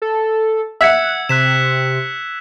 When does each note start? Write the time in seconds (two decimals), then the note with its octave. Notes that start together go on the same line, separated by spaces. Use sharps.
0.02 A4
0.81 E5 F#5 E6 G#6 C#7
1.29 C3 F#6 B6 E7